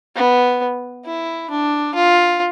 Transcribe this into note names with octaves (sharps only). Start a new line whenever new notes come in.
B3
E4
D4
F4